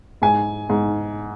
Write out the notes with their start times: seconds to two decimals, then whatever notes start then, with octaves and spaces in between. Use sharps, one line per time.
0.22 G#2 G#5
0.69 G#2